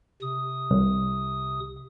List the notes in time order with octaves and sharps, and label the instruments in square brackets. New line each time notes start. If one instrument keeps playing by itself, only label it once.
[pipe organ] C3 D#6
[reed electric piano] C2